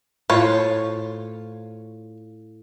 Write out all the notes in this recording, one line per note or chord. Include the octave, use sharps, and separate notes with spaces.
A2 F4 C5 C#5